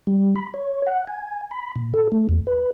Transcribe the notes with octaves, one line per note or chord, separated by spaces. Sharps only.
G3
B5
C#5
F#5
G#5
B5
A#2
A4
A3
E2
B4